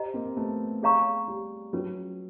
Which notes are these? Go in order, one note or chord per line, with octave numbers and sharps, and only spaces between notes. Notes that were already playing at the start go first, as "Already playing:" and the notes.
Already playing: G4 C5 D#5 G5 A#5
A#3 C4
A3 B3
G#4 C#5 F5 A#5 C#6
G3
F#3 C#4 F4 G#4 B4